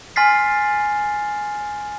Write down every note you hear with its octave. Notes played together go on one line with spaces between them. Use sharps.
G#5 C6 F6 A6 B6 C7